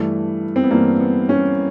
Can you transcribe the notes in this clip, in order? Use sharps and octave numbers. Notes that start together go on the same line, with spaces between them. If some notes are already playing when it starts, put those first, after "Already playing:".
Already playing: G2 E3 A3
C4
B3
G2 E3 A#3
B3
C#4